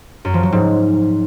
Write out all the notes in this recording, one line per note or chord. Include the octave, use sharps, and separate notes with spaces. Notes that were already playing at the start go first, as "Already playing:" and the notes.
F#2
F3
F#3
G#2